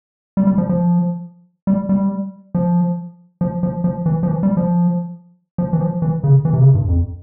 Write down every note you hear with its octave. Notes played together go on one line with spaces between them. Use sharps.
G3
G3
F3
F3
G3
G3
F3
F3
F3
F3
E3
F3
E3
G3
F3
F3
E3
F3
E3
C#3
E3
C3
C#3
G2
F2